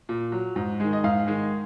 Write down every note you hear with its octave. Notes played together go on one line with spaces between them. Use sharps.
A#2
F#3
G#2
D#3 G#3
D#5
G#2 F5
D#3 G#3